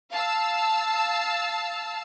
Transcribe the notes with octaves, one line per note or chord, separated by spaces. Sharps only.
F5 A5 E6